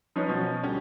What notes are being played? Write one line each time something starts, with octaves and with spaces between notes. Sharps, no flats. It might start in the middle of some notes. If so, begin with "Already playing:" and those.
F3 C#4 D#4 B4 C#5
B2 F3 C#4
D2 G3 C#4